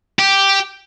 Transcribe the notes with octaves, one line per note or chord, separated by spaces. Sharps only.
G4